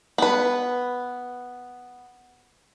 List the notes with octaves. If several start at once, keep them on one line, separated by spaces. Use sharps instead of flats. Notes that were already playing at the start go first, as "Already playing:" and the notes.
B3 B4